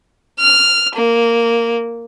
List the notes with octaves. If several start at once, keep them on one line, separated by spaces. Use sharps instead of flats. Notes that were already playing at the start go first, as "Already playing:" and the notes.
F6
A#3